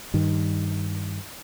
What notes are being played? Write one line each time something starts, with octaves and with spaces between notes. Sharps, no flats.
G2 D#3